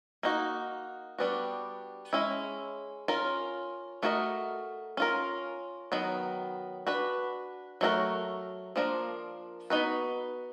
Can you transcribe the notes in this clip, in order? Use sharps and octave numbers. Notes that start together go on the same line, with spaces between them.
A#3 D#4 F#4
G3 B3 D4 F#4
G#3 C#4 E4
C#4 F4 A#4
A3 D4 F#4 A#4 D#5
C#4 F4 A#4
D#3 F#3 B3
D4 F#4 B4
F#3 A3 D4 F#4 A#4
F3 A#3 D4 F4 A#4
B3 D#4 F#4 B4